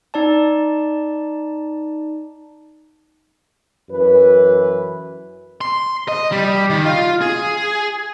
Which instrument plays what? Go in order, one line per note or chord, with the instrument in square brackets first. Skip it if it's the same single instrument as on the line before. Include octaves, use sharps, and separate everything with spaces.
[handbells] D#4 D5 A5
[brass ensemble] F#2 E3 B4
[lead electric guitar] C6
D#5
G3
D#3
F4
G#4